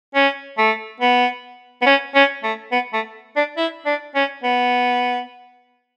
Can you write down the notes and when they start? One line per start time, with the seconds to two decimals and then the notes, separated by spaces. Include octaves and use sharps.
0.15 C#4
0.58 A3
1.00 B3
1.82 B3
1.86 C#4
2.15 C#4
2.43 A3
2.72 B3
2.93 A3
3.36 D4
3.57 E4
3.86 D4
4.15 C#4
4.43 B3